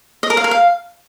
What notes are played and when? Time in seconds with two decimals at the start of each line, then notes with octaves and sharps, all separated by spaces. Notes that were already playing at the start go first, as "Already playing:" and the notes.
0.23 D#5
0.30 A#4
0.37 F5
0.44 A#4
0.51 F5